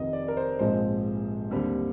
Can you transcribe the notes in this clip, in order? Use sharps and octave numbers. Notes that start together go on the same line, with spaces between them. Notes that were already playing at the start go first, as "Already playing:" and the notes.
Already playing: F1 F2 D#3 D#5
D5
A#4
C5
A#1 G#2 F3 G#3 C4 C5
D#2 D3 G3 C4